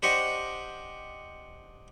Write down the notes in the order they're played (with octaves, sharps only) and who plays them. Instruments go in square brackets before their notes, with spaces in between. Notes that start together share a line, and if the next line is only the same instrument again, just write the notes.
[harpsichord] D4 G4 C5 D#5 F#5 C#6